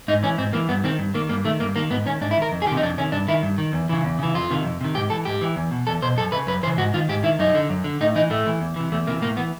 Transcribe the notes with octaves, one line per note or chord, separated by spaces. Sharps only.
G#2 D#4
E3 C#4
G#2 C4
E3 A#3
G2 B3
D#3 C4
G2
D#3 A#3
G2 A#3
D#3 A3
G2 A#3
D#3 A#3
G#2 B3
D#3 C#4
G#2 D4
E4
D#3 A#4
F2
G#4
C3 D#3 G4
D#4
F2 D4
C3 D#3 C#4
G2 D4
D#3 E4
G2
D#3
E2
C#3 E3
E2
C#3 E3
F2 F4
C3 D#3
F2
C3 D#3
G#2 G4
E3 A4
G#2 G4
E3
E2
B2
E2 A4
B2 C5
F#2 A4
E3 B4
C#3
F#2 B4
C#3 E3 C5
G#2 F#4
D#3 F4
G#2 G4
D#3 E4
F#2 D#4
D3
F#2
D3
A2 D#4
E3 D#4
A2 A3
E3
E2
C3 E3
E2 A3
C3 E3 A#3
A2 A#3
E3 B3